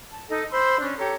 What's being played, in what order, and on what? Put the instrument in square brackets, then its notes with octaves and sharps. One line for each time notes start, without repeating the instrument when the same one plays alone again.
[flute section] A5
D#4 A4 D#5
C5 B5 C6 E6
C#4 D4 D5
G4 A4 C#5 A#5